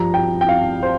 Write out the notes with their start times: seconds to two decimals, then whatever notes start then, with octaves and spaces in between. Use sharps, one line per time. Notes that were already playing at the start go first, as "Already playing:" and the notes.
Already playing: G2 F3 A#5
0.14 G5
0.41 G5
0.49 F5
0.83 C5